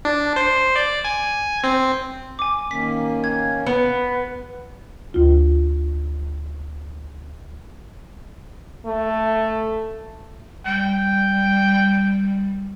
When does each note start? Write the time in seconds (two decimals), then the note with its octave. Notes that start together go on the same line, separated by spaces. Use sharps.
0.05 D4
0.36 C5
0.76 D5
1.04 G#5
1.64 C4
2.39 G#5 D6
2.71 D#3 A#3 C#4 B6
3.24 G#6
3.67 B3 B4
5.14 D2 F4
8.86 A3
10.66 G3 G5